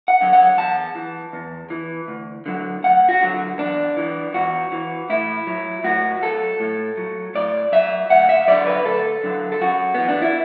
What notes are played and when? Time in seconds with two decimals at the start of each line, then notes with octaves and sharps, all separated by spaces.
0.08 F#5
0.21 D3 F#3
0.33 F#5
0.57 E2 A5
0.95 E3
1.33 E2
1.70 E3
2.08 D2
2.46 D3 F#3
2.84 D2 F#5
3.09 F#4
3.21 D3 F#3
3.59 E2 D4
3.97 E3
4.34 E2 F#4
4.72 E3
5.10 A2 E4
5.47 F#3
5.84 A2 F#4
6.22 F#3 A4
6.60 A2
6.97 F#3
7.35 A2 D5
7.72 F#3 E5
8.10 D2 F#5
8.29 E5
8.48 D3 F#3 D5
8.67 B4
8.85 D2 A4
9.24 D3 F#3
9.52 A4
9.61 F#2 F#4
9.95 E3 B3
10.09 D4
10.22 E4